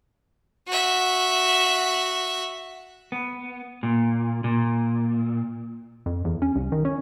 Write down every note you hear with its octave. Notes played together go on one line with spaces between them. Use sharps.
F#4 E5
B3
A#2
A#2
F2
E2
C#4
C2
D#3
C#4